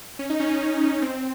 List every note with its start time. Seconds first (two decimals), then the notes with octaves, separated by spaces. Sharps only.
0.19 C#4
0.30 D#4
0.40 C#4
0.61 D#4
0.82 C#4
1.02 C4